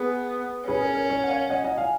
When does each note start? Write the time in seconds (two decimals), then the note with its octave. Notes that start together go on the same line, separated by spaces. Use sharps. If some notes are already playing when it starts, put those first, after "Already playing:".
Already playing: B3 G#4 B4
0.68 C#4 G#4 B4
0.82 A#4
0.95 A#4
1.09 A#4 C#5
1.23 F#5
1.30 C#5 F5
1.50 D#5 F#5
1.64 D#5 F#5
1.78 F5 G#5